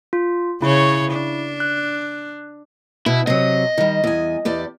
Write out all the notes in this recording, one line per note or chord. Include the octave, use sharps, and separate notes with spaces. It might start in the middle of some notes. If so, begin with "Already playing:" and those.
F4
C#3 E4 C#5
D4
F#6
B2 E4
C3 F#3 D#5
D#3 G3
E2 G#5
E2 G4 D5